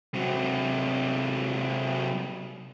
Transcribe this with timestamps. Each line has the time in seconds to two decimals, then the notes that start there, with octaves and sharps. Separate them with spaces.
0.14 C3 F#3